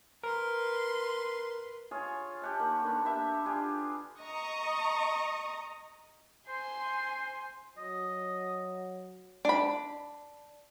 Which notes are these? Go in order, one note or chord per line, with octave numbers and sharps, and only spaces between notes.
A#4 B4 C6
F4 G#4 C#5
G4 F#5 A5
D#3 A#3
D3 A#3 B3
G4 A4 E5
D4 F4 G4 G#4
D#5 A#5 C#6 D#6
C5 G#5 C6
F#3 D#5
D4 B5